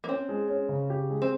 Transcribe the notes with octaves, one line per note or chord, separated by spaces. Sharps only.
A#3
C4 C#4
G#3
C#4
C#3
G4
G#3
C4